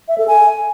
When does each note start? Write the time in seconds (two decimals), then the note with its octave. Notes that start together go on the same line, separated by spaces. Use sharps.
0.08 E5
0.18 A4
0.28 G#5